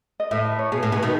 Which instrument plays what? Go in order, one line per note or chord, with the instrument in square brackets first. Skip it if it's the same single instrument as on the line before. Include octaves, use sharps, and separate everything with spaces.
[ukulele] D#5
[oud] A2 [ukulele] E5
[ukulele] D#5
B4
C#5
[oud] B2 [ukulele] G#4
[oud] A2
[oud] B2 [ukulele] G#4
[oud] B2 D#3